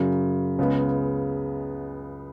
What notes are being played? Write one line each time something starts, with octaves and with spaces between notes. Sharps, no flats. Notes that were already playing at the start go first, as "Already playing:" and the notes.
Already playing: F#2 C#3 F#3
C#2 C#3 G#3 B3